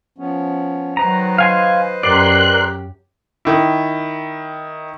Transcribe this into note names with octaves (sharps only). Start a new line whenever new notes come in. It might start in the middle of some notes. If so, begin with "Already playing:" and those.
F3 B3 C#4
D#3 F#3 B4 C5 D#5 A#5
F5 G#5 C6
F#2 G4 A#4 D5 C6 F#6
D#3 E4